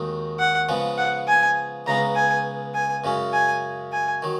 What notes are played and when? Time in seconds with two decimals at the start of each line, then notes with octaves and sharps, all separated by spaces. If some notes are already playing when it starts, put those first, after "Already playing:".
Already playing: D#2 D#3 G#3 D#4 F#4
0.39 F#5
0.69 C#3 F3 G#3 B3
0.98 F#5
1.28 G#5
1.86 C#2 C#3 G#3 B3 A#5
2.15 G#5
2.74 G#5
3.04 F#2 C#3 G#3 C#4
3.33 G#5
3.92 G#5
4.22 D#3 F#3